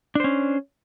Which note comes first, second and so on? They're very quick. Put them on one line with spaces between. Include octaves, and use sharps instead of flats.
D4 C5 C#4